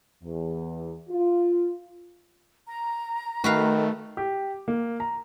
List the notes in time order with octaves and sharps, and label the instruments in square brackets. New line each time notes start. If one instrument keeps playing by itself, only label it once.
[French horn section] E2
F4
[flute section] A#5
[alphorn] D#3 [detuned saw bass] A3 [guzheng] F#4 B4 F5
[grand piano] G4
A#3
A#5